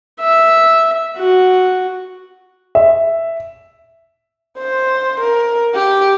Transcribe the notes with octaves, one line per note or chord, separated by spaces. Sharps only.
E5
F#4
E5
C5
A#4
G4